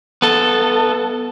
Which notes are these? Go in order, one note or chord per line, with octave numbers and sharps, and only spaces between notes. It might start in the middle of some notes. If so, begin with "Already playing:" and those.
B3 A4